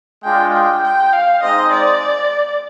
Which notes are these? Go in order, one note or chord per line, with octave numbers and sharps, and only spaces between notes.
G#3 D4 F4 G5
G5
G5
F5
G#3 C4 D#4 G#4 C5 D#5
D5